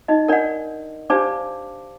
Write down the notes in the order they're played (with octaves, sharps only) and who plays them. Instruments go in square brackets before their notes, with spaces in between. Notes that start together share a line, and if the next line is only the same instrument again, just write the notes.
[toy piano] D#4 D#5
[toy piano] D4 D5 [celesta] A#4 D#5 F#5
[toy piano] D4 D5 [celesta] G4 C5 F5 A5 D6